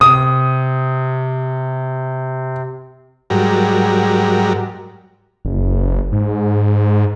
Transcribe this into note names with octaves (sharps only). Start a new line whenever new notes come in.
C3 D#6
G#2 F#3 G3 A#4
F#1
G#2